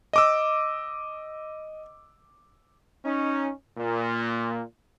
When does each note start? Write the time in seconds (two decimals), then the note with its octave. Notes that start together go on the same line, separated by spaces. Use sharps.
0.13 D#5 D6 E6
3.05 C#4 D#4
3.77 A#2